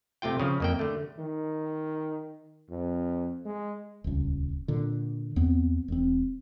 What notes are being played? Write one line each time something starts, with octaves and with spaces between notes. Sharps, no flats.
C3 A3 F4 G5
C#3 F3
F2 A#3 G5
D3 A3
D#3
F2
G#3
D#1 C#2
A#2 D3
E2 B3 C4
E1 C4